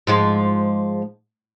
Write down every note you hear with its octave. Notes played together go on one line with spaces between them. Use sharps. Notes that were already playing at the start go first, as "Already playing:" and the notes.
G#2 F3 G#3